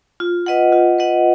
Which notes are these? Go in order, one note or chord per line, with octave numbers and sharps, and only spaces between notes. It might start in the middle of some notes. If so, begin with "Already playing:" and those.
F4
B4 D#5 F#5
F4
B4 D#5 F#5